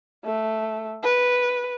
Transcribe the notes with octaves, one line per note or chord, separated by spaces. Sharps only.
A3
B4